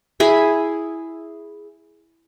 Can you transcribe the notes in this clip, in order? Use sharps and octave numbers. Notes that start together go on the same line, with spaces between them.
E4 G#4 E5